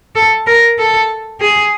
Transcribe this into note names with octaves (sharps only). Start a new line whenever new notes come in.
A4
A#4
A4
G#4